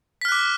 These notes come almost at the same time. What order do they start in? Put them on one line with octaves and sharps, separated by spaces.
B6 F6 F#6 D6